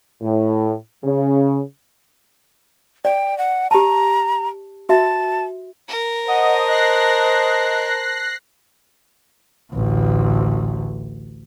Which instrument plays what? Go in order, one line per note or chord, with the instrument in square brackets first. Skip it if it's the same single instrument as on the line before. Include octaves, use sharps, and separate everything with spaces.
[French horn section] A2
C#3
[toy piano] D5 [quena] G5
[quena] F#5
[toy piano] G4 A5 [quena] A#5
[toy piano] F#4 E5 [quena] A5
[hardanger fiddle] A#4
[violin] C5 A5 [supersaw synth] D#5 [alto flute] F#5
[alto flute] D#5 [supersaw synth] F#6 A#6 C7
[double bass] A1 D2